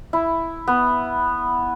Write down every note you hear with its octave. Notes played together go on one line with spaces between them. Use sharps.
E4
B3